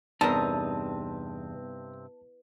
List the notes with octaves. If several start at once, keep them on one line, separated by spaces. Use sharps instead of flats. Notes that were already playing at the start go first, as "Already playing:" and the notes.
E2 G2 C3 C4 D#4 A#4 A5